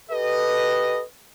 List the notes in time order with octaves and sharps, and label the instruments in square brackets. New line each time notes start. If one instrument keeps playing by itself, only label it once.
[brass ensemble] G4 A4 B4 D#5